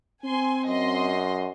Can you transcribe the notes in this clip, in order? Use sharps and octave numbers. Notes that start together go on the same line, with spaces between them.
C4 G#5 C6
F#2 D#5 C6